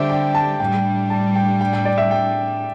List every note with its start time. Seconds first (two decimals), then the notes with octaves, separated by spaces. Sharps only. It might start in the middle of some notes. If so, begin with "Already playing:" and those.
Already playing: D3 G3 D4 G4 C5 D5 E5
0.10 G5
0.35 A5
0.59 A2 G3 D4 G5
1.10 A5
1.36 G5
1.61 G5
1.73 G5
1.85 D5
1.98 E5
2.11 G5